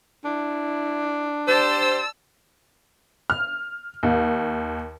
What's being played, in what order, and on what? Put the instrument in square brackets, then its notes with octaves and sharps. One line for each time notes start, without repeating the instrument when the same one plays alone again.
[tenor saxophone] D4 [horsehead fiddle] E4
[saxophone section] G4 C5 [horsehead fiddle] D5 A5 [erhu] E6
[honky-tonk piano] F6
D#2